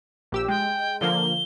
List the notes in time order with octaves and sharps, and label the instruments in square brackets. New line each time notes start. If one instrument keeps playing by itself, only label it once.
[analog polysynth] A#1 G4 E6
[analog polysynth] G#3 [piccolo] G5
[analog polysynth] D3 F3 A#3 [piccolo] G7